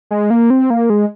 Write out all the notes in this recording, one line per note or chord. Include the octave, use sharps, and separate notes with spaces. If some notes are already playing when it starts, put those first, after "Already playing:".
G#3
A#3
C4
A#3
G#3